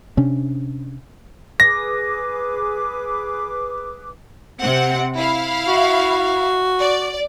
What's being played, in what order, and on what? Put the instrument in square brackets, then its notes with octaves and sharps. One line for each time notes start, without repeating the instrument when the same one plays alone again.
[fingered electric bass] C3 C#4 D4
[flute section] G#4 B4 D6 [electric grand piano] A#6
[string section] C3 C4 F#5
E4 F5
[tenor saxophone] F#4
[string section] D5